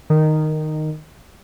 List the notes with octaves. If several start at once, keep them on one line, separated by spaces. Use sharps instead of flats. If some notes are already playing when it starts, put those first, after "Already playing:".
D#3